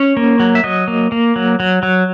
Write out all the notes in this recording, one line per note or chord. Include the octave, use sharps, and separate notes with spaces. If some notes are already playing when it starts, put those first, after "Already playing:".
Already playing: C#4
A#3
F#3
E5
F#3 D#5
A#3
A#3
F#3
F#3
F#3